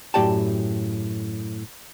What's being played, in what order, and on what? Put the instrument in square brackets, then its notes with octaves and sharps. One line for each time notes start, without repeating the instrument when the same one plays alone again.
[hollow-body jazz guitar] F#2 A2 G4 D5 G5 A5